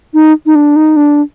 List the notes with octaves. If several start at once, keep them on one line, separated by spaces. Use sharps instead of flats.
D#4
D#4
D4
D#4
D4